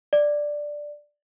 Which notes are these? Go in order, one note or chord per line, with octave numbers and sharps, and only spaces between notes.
D5